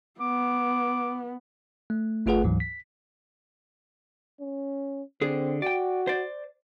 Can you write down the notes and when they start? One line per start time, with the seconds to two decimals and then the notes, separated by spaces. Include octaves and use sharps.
0.20 B3 D6
1.90 A3
2.26 G1 A3 F4 G#4 B4 F#5
2.44 D2 G#2 E3 F#3
2.60 B6
4.41 C#4
5.21 D3 C4 G#4
5.62 F#4 D5 G5
6.07 C5 D5